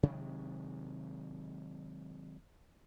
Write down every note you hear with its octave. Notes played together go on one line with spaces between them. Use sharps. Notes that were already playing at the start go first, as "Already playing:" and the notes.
C3 D#3 F#3 G#3